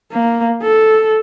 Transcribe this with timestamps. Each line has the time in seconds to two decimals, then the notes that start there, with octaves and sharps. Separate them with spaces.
0.12 A#3
0.62 A4